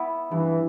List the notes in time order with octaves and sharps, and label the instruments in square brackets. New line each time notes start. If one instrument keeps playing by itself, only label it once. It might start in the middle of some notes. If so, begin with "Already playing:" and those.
Already playing: [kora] B3 E4
[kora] G2 [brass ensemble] E3